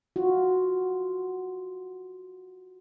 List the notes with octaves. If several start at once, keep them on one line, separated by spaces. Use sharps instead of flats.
F4 F#4